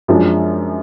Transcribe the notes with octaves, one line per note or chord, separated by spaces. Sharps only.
F#2 F3 G#3 D4